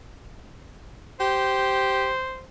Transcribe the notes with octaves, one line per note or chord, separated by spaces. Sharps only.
G4 C5